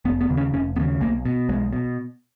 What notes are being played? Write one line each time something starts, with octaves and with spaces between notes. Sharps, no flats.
F1 B3
B3
D#2 C#3
C#4
F1 C#4
D#2 C#3 B3
B1 A#3
B2
B1 G#3
B2